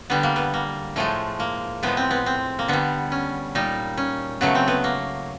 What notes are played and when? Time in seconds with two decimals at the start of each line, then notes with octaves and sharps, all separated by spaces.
0.10 D3 G3 B3
0.23 A#3
0.36 B3
0.54 A#3
0.96 A2 F3 G#3 A3
1.40 A#3
1.83 A2 F3 G#3 B3
1.97 C4
2.11 B3
2.26 C4
2.59 A#3
2.68 D3 G3 B3
3.12 C#4
3.55 A#2 G3 D#4
3.97 C#4
4.41 C#3 F#3 A3 B3
4.55 C4
4.68 B3
4.84 A#3